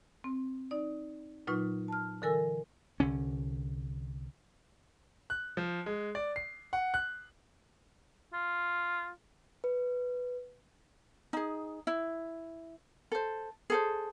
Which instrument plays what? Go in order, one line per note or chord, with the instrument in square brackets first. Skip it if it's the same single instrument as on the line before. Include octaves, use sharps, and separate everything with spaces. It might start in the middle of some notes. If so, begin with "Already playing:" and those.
[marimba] C4
D#4 D5
A#2 F#3 D#4 F4 B4 C#6
A5 F6
D3 E3 A4 A#4 G#5 E6
[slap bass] C2 D3 C#4
[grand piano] F#6
F3
G#3
D5
C7
F#5
F#6
[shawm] F4
[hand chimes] B4
[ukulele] D#4 G#4
E4
A4 C5
G#4 A4 C5